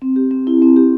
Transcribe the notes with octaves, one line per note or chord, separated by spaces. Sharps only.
C4
G4
C4
E4
C4
G4